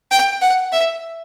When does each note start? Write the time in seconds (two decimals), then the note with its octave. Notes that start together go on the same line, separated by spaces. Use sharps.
0.11 G5
0.42 F#5
0.72 E5